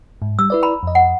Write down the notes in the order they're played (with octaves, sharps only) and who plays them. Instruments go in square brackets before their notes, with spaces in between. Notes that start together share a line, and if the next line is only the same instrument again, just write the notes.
[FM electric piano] G#2
[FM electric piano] G3 [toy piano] E6
[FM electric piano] E4 B4 D5
[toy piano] A#5 B5
[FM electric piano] F2 D#5
[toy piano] F#5